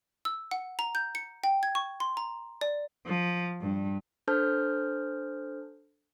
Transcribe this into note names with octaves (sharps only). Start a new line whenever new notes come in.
E6
F#5
A#5
G6
C#7
G5
G#6
C#6
C6
A#5
D5
F3
G2
D4 A4 C5 A5 F6 G6